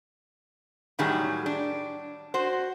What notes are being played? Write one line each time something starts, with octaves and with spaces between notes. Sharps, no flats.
A2 D#3 F#3 G3 G#4
D4
F#4 C5